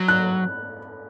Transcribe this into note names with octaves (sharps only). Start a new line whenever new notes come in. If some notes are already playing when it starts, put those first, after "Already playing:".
Already playing: F#3
F#6